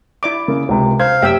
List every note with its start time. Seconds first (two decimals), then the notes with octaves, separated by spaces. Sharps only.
0.23 E4 D5 D6
0.48 C#3 A#3
0.69 C#2 C3
1.00 C5 F5 G#6
1.22 F#1 G4 E5 G5 E6